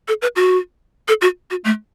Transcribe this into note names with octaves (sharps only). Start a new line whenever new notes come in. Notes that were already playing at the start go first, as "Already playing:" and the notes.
A4
B4
F#4
A4
F#4
F#4
A3